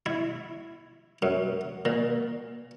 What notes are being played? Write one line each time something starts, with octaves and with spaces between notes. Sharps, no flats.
E4
F#2
A#2